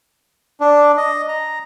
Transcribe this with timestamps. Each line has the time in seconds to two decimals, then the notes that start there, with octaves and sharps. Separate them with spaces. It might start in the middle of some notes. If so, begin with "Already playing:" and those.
0.60 D4
0.97 D#5
1.28 A#5